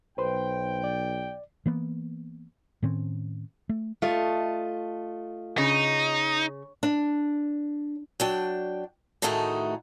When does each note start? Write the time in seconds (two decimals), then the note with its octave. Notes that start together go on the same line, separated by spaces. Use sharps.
0.18 B1 B4 C5 G5 C6
0.84 D5
1.66 E3 A#3 B3
2.83 A2 D#3 C4 C#4
3.69 A3
4.02 A3 F4 D#5
5.58 C#3 D#4
6.83 D4
8.20 F#3 D4 G5
9.22 A2 D#3 A3 D#4 F#4 G#4